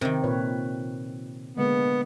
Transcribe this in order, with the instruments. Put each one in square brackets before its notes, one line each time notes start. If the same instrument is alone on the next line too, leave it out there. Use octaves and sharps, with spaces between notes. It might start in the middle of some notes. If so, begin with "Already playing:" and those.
[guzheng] C3 D#3 [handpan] A#4
[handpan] A#2 B4 C#5
[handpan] D3 G#3 A#3 [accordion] B3